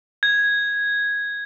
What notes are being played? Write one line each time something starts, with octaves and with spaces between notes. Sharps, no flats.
G#6